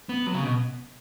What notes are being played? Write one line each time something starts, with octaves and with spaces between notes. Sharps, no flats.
B3
F#3
C#3
B2